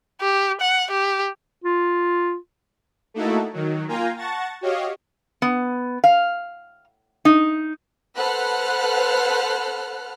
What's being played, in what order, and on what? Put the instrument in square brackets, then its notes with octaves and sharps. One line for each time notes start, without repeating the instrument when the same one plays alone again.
[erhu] G4
F#5
G4
[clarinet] F4
[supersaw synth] A3 A#3 D#4 E4 F#4 A4
D#3 F#3
A#3 F4 F5 G5 G#5 A#5
F#5 A5 C#6 A6 A#6
F#4 G4 C#5 D#5 F5
[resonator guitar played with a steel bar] B3
F5
D#4
[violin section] A4 B4 C5 F#5 F6 F#6